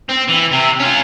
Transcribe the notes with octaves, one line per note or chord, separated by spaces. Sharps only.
C4
E3
C3
C#4 F4